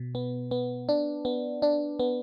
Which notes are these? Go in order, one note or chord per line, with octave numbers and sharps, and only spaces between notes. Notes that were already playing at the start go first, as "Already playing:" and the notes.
Already playing: B2
B3
B3
D4
B3
D4
B3